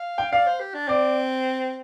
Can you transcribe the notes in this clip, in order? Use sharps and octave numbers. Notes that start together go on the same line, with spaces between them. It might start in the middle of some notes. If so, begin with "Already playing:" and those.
Already playing: F5
G5
D5 F5
C5
G4
D4
C4 D5